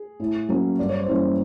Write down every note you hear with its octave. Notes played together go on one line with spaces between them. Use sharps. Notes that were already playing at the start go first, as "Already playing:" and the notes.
Already playing: G#4
A2
F#3 A#3 C#4
G2 D5
C#5
C5
E3 G3 A#3 C#4 C#5